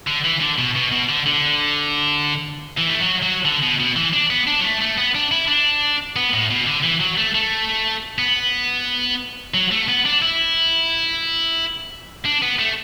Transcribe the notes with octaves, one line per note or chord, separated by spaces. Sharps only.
D3
E3
D3
B2
B2
B2
D3
D3
E3
A3
F#3
F#3
D3
B2
B2
E3
D4
B3
D4
F#3
A3
A3
B3
D4
E4
D4
B3
A2
B2
D3
E3
F#3
A3
A3
B3
F#3
A3
B3
D4
E4
D4
B3
A3